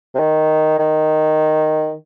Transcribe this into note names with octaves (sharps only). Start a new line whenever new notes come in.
C3
D#3
D#3